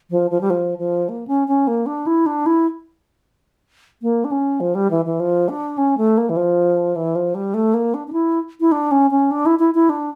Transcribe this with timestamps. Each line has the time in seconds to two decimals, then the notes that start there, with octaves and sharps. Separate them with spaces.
0.11 F3
0.31 F3
0.41 G3
0.50 F3
0.79 F3
1.09 A#3
1.27 C#4
1.48 C#4
1.67 A#3
1.86 D4
2.07 E4
2.26 D4
2.46 E4
4.02 A#3
4.25 D4
4.31 C#4
4.60 F3
4.75 G3
4.91 E3
5.05 E3
5.20 F3
5.49 D4
5.78 C#4
5.98 A3
6.18 A#3
6.30 E3
6.37 F3
6.96 E3
7.15 F3
7.35 G3
7.54 A3
7.74 A#3
7.94 D4
8.08 D4
8.13 E4
8.61 E4
8.72 D4
8.91 C#4
9.11 C#4
9.31 D4
9.46 E4
9.59 E4
9.74 E4
9.90 D4